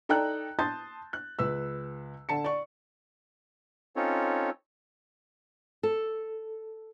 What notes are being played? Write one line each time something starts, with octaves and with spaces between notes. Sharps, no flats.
D#4 A4 D5 G5 A#5 F#6
A5 C6 D#6 G6 A6
F#6
C#2 B4 E6
D3 A5 C#7
D5 C#6
C4 C#4 D#4 F4 A4 C#5
A4